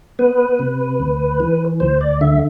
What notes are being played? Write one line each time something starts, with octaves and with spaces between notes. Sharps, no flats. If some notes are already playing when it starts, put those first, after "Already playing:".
B3 B4
C3
D2
E3
D2 C5
D5
D3 E5